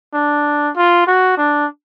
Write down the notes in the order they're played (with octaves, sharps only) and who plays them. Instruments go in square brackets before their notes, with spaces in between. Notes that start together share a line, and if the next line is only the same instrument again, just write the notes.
[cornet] D4
F4
F#4
D4